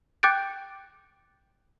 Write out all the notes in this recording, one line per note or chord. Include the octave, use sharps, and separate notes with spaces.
G5 D6 F#6 G6 A6 D7